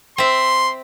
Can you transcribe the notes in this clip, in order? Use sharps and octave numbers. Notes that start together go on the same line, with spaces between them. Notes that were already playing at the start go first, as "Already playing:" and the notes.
C4 E5 C6